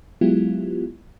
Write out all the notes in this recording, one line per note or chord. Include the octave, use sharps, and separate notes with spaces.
F#3 G#3 B3 E4 F4 G4